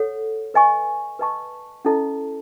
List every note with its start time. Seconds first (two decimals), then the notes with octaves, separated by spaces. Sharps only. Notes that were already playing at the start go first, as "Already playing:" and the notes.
Already playing: A4 C#5 F#5
0.54 B4 D#5 G#5 C#6
1.19 B4 D#5 A5 C#6
1.85 C#4 E4 A4 D#5 A5